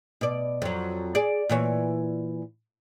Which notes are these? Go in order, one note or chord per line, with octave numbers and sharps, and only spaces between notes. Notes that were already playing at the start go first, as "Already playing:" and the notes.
B2 D5
F2 F#3
G#4 D5
A#2 E3 C#5